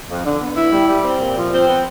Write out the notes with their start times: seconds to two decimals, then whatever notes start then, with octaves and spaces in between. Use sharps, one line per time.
0.09 F2
0.25 D3
0.40 B3
0.56 E4
0.72 G3
0.88 G3
1.04 C4
1.20 A#2
1.36 F3
1.52 C4
1.68 B3